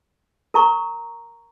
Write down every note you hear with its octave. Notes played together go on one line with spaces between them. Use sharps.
A#4 A#5 C#6